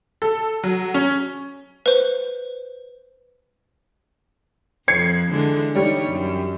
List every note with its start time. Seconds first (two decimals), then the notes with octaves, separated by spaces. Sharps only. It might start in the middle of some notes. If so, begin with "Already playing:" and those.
0.22 A4
0.64 F#3
0.94 C#4
1.86 B4 C5
4.88 F2 G#6 C7 C#7
5.31 D3 E3 G#3
5.75 G3 D#4 C#5
6.06 F#2